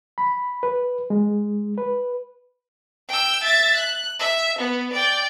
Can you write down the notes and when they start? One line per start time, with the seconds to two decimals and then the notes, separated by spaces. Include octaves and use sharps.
0.18 B5
0.63 B4
1.10 G#3
1.78 B4
3.09 G5 E6
3.43 E5 A6
3.76 F#6
4.19 E5
4.59 B3
4.93 D5 G5